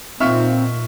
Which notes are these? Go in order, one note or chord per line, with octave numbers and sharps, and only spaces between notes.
A#2 C4 D#4 F4 E5 C#6 F6